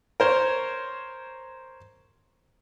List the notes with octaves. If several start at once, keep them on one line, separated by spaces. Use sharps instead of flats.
A#4 C5 C#5